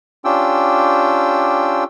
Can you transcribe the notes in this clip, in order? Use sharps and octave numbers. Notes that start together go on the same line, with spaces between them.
C#4 D4 F4 G4 G5 E6